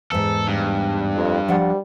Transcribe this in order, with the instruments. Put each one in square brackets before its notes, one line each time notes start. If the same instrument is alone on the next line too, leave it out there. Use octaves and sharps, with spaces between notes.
[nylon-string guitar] E2 G#2 [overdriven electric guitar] A4
[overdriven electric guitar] G2
[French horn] F2
[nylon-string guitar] F3 D4 F#5 [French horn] G3